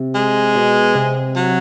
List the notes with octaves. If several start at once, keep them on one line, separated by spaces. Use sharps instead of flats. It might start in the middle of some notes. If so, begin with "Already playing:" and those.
Already playing: C3
G#3
B2
C3
F#3